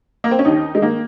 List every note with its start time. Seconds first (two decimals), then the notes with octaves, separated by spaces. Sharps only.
0.24 A#3
0.31 C4
0.39 C#4
0.45 D#2 D#3 D#4
0.75 G#3
0.82 D#3 A#3